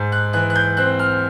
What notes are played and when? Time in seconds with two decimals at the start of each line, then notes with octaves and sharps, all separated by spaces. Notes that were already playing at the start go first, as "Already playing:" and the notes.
Already playing: G#2
0.12 F#6
0.33 E3 F#6
0.50 F#6
0.55 G6
0.77 C4 F#6
0.99 F6